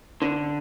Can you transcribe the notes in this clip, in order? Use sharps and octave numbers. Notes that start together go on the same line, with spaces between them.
D3